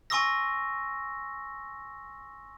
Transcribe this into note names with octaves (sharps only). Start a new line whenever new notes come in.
G#5 C6 C#6 D#6 E6 A#6